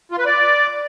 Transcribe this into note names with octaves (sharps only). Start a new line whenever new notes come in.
F4
B4
D5